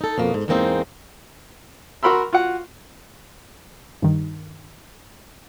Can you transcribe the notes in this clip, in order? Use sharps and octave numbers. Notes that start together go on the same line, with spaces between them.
D#4 A4
F2 B2 A#3
G#2
E2 G#2 G#3 A#3 C4 D#4
F#4 A#4 B5 C6 E6
F4 F#4 F#5
G2 D#3